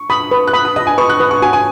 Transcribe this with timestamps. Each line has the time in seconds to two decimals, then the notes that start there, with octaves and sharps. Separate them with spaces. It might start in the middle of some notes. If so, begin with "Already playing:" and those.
Already playing: C#6
0.10 B5 D#6
0.31 B4 D#6
0.47 F#6
0.53 B5 D#6
0.65 D#6
0.76 D#5 D#6
0.87 G#5
0.98 B4 C#6
1.09 F#6
1.20 B4 D#6
1.31 C#6
1.42 F#4 G#5
1.53 G#5